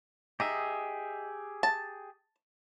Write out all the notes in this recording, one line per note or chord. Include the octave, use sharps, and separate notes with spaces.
D#4 G4 G#4 E5
A5